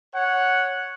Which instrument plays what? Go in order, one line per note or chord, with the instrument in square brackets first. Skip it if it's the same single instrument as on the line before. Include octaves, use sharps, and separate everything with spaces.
[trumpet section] C#5 F#5